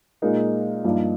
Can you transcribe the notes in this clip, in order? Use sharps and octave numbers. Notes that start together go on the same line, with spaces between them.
A#2 G#3 D#4 A#4
G2 F3 A#3 D#4